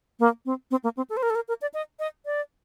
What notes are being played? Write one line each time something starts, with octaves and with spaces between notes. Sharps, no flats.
A#3
C4
C4
A#3
C4
A4
C5
A#4
A4
A#4
A#4
D5
D#5
D#5
D5